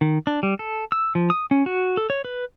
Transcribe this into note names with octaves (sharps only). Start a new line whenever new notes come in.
D#3
D4
G3
A4
E6
F3
D#6
C#4
F#4
A4
C#5
B4